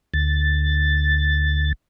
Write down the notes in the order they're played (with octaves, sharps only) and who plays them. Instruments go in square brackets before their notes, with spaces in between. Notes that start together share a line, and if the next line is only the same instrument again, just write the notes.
[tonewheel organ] D2 A6